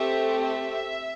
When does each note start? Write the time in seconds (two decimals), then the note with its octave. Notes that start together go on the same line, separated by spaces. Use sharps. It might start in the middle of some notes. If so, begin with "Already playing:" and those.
Already playing: A3 C4 G4 E5
0.41 E5